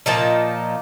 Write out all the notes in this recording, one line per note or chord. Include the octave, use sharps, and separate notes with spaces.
A#2 F3 D#4